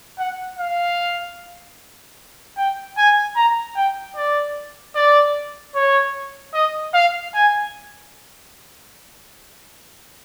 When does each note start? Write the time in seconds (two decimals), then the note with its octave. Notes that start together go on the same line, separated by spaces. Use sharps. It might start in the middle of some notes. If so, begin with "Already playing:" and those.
0.18 F#5
0.59 F5
2.57 G5
2.97 G#5
3.36 A#5
3.76 G5
4.16 D5
4.95 D5
5.75 C#5
6.54 D#5
6.94 F5
7.34 G#5